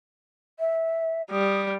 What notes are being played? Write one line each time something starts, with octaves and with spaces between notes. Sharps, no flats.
E5
G3 D#6